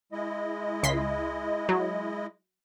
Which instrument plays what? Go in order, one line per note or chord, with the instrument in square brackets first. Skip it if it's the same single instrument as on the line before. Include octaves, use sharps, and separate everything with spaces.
[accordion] G#3 E4 D#5
[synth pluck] C#2 C6 B6
F#3